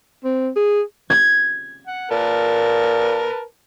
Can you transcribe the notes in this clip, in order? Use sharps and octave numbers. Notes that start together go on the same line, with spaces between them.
C4
G#4
G#6
F#5
A#2 A#4 B4 A5